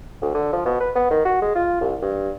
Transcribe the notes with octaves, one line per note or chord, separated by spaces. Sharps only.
D2
D3
F3
B2
B4
B3
D#3
F#4
G#3
F4
C2
G2